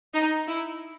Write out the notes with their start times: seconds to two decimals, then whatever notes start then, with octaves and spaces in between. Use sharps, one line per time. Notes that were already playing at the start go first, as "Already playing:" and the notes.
0.14 D#4
0.48 E4